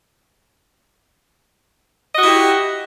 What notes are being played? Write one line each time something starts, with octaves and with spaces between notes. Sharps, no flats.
E4 F#4 G4 D#5